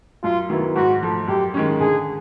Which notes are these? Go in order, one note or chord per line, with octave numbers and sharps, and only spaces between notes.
F#2 F4
D#3 F#3 B3 E4
G#2 F#4
F3 A3
F#2 G4
D#3 G#3 C#4
D3 G#4